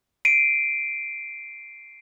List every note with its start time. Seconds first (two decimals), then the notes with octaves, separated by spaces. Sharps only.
0.25 C7 D7 D#7